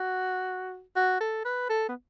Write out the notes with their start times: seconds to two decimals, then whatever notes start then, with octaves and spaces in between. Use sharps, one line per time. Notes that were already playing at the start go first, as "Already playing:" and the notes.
Already playing: F#4
0.96 F#4
1.20 A4
1.45 B4
1.70 A4
1.89 B3